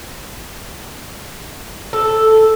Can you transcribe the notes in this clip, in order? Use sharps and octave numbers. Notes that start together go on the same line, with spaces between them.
A4